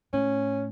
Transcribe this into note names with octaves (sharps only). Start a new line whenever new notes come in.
A2 C#4